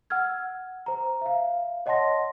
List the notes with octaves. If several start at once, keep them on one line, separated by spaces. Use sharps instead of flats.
F#5 E6 F6 G#6
C5 A#5
E5 F5
C#5 D#5 F#5 A5 C6 A#6